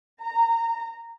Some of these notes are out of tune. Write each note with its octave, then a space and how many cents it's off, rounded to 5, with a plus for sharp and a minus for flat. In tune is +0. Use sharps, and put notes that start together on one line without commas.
A#5 -20